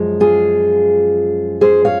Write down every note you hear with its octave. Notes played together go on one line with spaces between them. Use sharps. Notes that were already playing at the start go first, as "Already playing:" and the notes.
Already playing: F#2 F3 G#3
F4 G#4
G#4 C5
C#5 F5